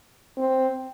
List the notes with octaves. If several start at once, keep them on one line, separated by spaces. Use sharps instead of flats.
C4